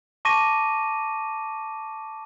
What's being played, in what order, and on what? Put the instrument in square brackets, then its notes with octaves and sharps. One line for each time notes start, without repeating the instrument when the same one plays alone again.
[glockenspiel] A5 C#6 D6 A#6 D#7